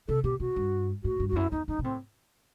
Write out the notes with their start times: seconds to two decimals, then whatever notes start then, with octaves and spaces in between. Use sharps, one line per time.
0.08 C3 A4
0.24 B2 G4
0.40 B2 F#4
0.56 G2
1.04 A2 F#4
1.20 G2
1.29 F#4
1.32 E2
1.36 F#2 E4
1.52 E2 D#4
1.68 F#2 D#4
1.79 B2
1.84 A2 C4